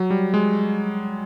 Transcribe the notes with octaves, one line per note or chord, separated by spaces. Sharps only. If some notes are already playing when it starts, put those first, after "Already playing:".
Already playing: F#3
G3
G#3